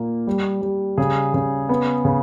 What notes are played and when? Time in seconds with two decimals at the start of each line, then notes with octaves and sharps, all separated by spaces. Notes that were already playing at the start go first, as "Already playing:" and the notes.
Already playing: A#2 A#3
0.27 G3
0.62 G3
0.98 C#3 G#4
1.34 C#3
1.69 B3
2.05 C#3